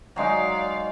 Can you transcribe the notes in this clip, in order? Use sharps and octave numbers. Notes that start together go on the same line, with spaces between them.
F#3 G#3 D#4 D5 F5